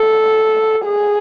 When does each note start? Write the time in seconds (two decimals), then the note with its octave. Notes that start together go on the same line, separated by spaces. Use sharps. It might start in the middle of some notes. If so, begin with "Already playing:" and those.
Already playing: A4
0.85 G#4